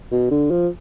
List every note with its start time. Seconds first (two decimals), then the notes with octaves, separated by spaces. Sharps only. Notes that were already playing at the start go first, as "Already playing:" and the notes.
0.12 B2
0.31 D3
0.51 F3